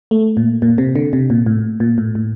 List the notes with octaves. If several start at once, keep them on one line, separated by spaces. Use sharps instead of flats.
A3
A#2
A#2
C3
D3
C3
A#2
A2
A#2
A2
A2